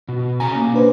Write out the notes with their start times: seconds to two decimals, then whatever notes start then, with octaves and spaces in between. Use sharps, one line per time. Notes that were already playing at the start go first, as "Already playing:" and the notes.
0.09 B2
0.40 C3 C#4 G#5 A#5
0.55 A#3
0.74 D4 B4 C5